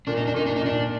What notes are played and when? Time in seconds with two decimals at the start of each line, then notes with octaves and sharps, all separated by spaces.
0.07 A#2 D4
0.17 D#4
0.27 D4
0.34 A#2 D#4
0.46 D4
0.56 D#4
0.61 A#2 D4